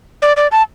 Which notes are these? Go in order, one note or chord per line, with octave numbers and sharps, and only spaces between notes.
D5
D5
A5